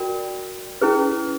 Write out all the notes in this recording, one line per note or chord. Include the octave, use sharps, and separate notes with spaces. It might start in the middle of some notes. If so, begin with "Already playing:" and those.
Already playing: F#4 A#4 D5 G5
C#4 E4 G#4 B4